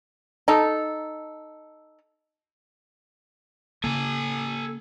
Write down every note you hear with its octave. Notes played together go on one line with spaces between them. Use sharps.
D#4 A4
C#3 A#3 A4 G#5